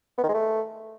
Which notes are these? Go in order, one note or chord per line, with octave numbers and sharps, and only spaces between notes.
B3
D#3
G#3
A3